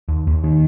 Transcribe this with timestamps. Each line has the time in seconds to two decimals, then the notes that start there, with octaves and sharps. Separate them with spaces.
0.09 D#2
0.27 D#2
0.44 D#3